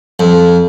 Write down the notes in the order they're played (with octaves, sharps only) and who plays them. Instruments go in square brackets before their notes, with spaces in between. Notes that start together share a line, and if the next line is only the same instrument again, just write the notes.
[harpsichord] F2